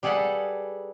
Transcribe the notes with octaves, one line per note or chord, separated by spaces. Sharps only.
G3 G#4 A4 B4 F#5 G#5